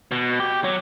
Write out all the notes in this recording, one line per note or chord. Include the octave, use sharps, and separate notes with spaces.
B2
G4
F#3